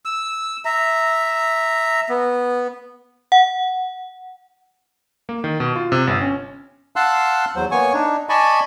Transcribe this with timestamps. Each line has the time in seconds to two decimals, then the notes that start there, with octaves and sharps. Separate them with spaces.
0.05 E6
0.65 E5 A#5
2.09 B3
3.32 F#5
5.29 A#3
5.44 D#3
5.60 B2
5.76 F4
5.92 C3
6.07 G1
6.21 C#4
6.96 F5 F#5 A5 C6 E6 F#6
7.56 E2 F#3 C5
7.71 A#3 B3 C#5 G#5 C#6
7.93 D4 D#4
8.29 D5 D#5 G#5 A5 B5 C#6